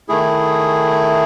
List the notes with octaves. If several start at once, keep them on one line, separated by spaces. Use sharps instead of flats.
D#3 A3 E4 G#4